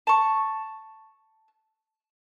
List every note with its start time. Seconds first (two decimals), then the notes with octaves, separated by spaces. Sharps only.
0.07 A5 C#6